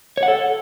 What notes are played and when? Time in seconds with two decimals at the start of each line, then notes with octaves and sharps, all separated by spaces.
0.17 C#5
0.23 F#5
0.28 A4